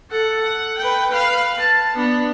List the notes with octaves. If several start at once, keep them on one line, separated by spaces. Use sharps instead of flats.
A4 F#5
F#5
B4 G5
B4 F5
A5
B3 D4